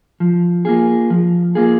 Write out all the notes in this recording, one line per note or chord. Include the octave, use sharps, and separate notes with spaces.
F3
A#3 F4 G#4
F3
A#3 F4 G#4